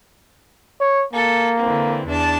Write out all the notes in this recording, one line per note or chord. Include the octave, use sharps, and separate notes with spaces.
C#5
A#3 A4
D3 E3 C4
E2 D4 A5